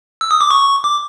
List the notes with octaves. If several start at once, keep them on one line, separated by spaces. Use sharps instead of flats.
E6
D#6
D6
C#6
D6